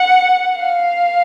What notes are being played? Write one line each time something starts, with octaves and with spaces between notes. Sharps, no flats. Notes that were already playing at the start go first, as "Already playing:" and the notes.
Already playing: F#5
F5